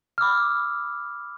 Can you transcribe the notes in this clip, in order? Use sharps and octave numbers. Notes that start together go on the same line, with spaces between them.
B5 D6 E6 F6